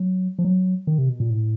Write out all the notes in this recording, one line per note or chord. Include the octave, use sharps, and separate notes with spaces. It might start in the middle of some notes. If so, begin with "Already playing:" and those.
Already playing: F#3
F3
F#3
D#3
C3
B2
A#2
A2